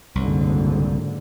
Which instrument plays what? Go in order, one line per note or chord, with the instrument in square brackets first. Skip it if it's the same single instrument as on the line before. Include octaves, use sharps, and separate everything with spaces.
[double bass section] F#1 G#2 D3 [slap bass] C2